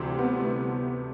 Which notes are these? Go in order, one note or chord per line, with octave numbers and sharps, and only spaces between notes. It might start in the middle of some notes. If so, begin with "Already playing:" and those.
Already playing: D2 C3 E3 G3 C4
B3
A3